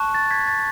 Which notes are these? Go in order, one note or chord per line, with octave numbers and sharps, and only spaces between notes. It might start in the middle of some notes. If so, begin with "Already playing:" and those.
Already playing: A5 C#6 F#6
A6
G#6 B6
A6